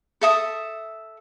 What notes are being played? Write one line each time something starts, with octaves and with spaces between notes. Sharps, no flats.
A4 E5 D#6